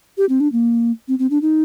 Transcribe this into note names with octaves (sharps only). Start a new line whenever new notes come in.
G4
C4
D4
A#3
C4
C4
D4
D#4